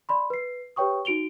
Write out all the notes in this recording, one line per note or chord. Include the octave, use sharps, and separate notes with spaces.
D5 B5 C6
B4 C7
G4 B4 C#5 G5 C#6 D#6
D#4 F#4 D7 F7 G7